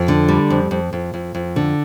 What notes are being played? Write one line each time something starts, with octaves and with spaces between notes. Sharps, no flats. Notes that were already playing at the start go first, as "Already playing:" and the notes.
Already playing: F2
D3
G3
F2
F2
F2
F2
F2
D3